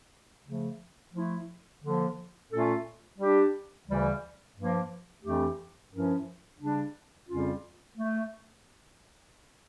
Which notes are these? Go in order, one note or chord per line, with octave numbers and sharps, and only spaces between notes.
C#3 F3 A3
F3 A3 E4
D3 F3 A#3
A#2 A3 C#4 F4 A4
G3 D4 G4
D2 C#3 E3 G3
G2 F3 A#3
F2 E3 A3 D4 G4
G2 F3 C#4 E4 A#4
C#3 G3 D4
F2 C#3 G3 C#4 F4
A3